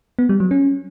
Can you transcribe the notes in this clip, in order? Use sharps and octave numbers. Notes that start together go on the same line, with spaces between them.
B3
G3
F#3
C#4